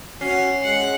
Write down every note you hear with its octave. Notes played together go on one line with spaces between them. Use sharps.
C#4 F#4 C7
G#3 F#5